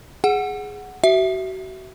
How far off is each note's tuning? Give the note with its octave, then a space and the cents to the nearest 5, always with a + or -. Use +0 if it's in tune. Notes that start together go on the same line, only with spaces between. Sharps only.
G#4 +0 F#5 +0
F#4 +35 E5 +0